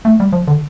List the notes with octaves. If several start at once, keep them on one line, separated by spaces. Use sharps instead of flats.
A3
G3
F3
D3